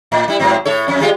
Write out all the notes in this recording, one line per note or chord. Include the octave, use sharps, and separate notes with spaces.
A2
G3 E4
G#2 F#3 C4
A2 A4 C#5
F2 C#4
G3 G#3 F4